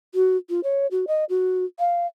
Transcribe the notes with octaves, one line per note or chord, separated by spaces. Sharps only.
F#4
F4
C#5
F#4
D#5
F#4
F5